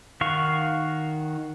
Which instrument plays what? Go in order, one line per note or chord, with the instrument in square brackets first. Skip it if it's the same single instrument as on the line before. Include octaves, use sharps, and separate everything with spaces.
[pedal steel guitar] D#3 F#4 F5 C#6